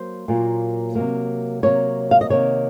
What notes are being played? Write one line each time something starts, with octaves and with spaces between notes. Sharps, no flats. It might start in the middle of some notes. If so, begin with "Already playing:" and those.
Already playing: F#3 A#3 C5
A#2 F#3 A#3
C3 F#3 A#3
C3 F#3 A#3 C#5
F5
D#5
C3 D#3 A#3 C#5